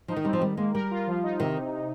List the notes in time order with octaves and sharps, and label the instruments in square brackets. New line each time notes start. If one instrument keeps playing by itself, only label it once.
[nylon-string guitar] F3 [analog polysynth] D#4
[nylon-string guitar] D#3
[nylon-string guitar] G3 [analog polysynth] C4
[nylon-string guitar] F3
[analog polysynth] D#3 [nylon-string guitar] G3
[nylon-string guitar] G#3 [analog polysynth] A#3
[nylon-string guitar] G3 [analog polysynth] A#4
[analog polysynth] F4
F3
D#4
[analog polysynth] C3 [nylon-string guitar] D#3